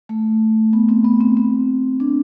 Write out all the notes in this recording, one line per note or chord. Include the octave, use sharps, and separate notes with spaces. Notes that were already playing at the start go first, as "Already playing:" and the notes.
A3
B3
C4
B3
C4
C4
D4